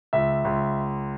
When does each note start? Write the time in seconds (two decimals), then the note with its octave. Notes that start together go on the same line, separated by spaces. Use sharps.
0.13 C#2 E5
0.44 C#2